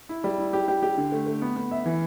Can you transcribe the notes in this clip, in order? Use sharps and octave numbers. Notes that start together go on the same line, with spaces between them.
E4
G3
E4
G4
G4
G4
D3
A3
A3
B3
B3
E5
E3